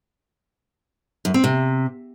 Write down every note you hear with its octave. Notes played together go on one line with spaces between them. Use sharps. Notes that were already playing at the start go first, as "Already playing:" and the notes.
F#2
C4
C3